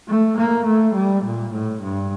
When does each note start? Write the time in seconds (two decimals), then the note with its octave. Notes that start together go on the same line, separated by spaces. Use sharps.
0.08 A3
0.38 A#3
0.66 A3
0.95 G3
1.24 A#2
1.53 A2
1.82 G2